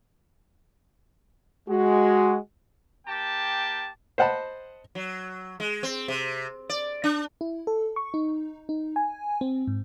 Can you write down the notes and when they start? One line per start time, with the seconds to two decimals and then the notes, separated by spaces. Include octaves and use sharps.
1.69 G#3 F#4
3.07 A#3 G4 G5 A5
4.18 C5 D#5 F#5 A5 B5
4.95 F#3
5.60 G#3
5.83 C4
6.08 C3
6.70 D5
7.04 D4
7.41 E4
7.67 A4
7.96 C#6
8.14 D#4
8.69 D#4
8.96 G#5
9.41 C4
9.68 G#2